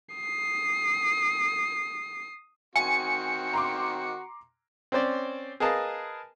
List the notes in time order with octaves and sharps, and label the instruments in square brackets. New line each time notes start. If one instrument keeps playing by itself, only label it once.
[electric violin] D#6 C7
[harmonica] D#3 C4 F#4 [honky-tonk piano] G#5 [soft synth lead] C#7
[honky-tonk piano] A#5 C6 D6
[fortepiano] C4 C#4 C5 D5
G#4 A#4 B4 D#5 F5 A5